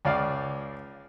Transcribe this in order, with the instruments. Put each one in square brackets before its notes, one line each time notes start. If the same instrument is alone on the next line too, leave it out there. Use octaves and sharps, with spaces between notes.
[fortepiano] C#2 D5 F5